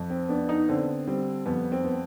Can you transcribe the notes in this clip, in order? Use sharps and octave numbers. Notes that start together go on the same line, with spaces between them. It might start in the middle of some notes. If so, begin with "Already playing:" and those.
Already playing: F2
C4
B3 D4
D#4
D3 C4
G3 C4
F2 B3
C4
B3